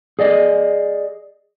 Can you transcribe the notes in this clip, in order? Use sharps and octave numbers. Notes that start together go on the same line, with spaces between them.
G#4 D5 D#5